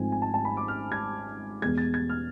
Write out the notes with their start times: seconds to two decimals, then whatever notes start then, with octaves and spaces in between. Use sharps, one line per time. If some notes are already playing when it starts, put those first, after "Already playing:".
Already playing: G#1 G#2 F3 A3 C4 G#5
0.12 G#5
0.22 A5
0.34 A5
0.45 B5
0.57 D6
0.68 F6
0.92 G#6
1.62 E2 B2 G#3 G#6
1.78 A6
1.94 G#6
2.09 F6